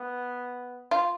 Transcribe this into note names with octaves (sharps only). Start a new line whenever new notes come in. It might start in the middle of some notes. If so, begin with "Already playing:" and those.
Already playing: B3
F4